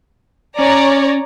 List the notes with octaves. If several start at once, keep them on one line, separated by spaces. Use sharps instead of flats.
C#4 C#5 D5 A#5